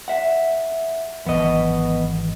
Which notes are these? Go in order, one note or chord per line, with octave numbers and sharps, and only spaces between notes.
E5 F#5
G#1 E3 F#3 B3 D#5